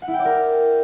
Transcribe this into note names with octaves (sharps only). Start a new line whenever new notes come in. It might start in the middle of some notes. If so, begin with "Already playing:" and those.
F#5
E4
G5
D5
A#4